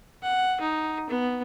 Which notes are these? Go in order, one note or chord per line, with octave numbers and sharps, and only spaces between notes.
F#5
D#4
B3